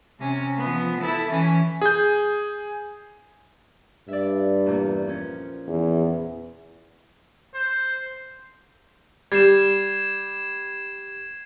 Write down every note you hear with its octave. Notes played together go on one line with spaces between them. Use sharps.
C3 C#4
F3 B3
E4 A4
E3 C#4
G#4 G6
G2 D5 E5
E2 A#2 A#3
F3 C#4
E2
C5
G3 G#6 C7 E7